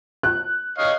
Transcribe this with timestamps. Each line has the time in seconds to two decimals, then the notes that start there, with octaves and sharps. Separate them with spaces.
0.23 F#6
0.78 C#5 D#5 F5